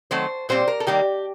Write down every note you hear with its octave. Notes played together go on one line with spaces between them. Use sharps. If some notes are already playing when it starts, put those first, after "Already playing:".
D#3 F#3 A3 C4 C5
A#2 G3 C4 C5
A#4
A4
D#3 G3 A#3 G4